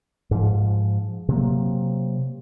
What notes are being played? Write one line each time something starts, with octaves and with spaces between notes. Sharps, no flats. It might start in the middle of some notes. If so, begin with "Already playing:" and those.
G#2 F3
C3 F#3 A#3